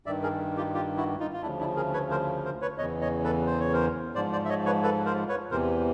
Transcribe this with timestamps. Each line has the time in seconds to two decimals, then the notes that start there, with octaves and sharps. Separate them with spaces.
0.06 G2 D#3 D5 E5
0.23 G#4 A#4
0.57 F4 G4
0.74 F4 G4
0.97 E4 F#4
1.20 D#4 F4
1.33 F4
1.42 D2 C#3 F3 D4 E4
1.60 D4 E4
1.76 G#4 A#4
1.93 B4 C#5
2.11 A#4 C5
2.45 A#4 C5
2.62 B4 C#5
2.78 E2 C#3 E3 C#5 D#5
3.01 C#5 D#5
3.24 A4 B4
3.46 C5
3.60 C#5
3.73 A#4 C5
4.15 G#2 F3 C5 D5
4.32 C5 D5
4.45 E5
4.49 C#5 D#5
4.66 B4 C#5
4.83 A4 B4
5.05 A#4 C5
5.29 B4 C#5
5.51 E2 C3 E3 A#4 C5